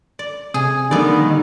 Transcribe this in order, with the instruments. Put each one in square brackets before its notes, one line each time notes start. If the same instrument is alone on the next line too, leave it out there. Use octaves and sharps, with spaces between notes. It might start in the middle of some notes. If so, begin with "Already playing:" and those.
[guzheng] D5
[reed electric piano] C3 [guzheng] G#4 [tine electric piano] G#5 D#6
[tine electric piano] D3 G3 A#3 [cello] D#3 [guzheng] B3 D5